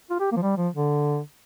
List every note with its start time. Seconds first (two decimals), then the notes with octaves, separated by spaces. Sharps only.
0.11 F4
0.20 G4
0.32 A#3
0.37 F3
0.42 G3
0.57 F3
0.74 D3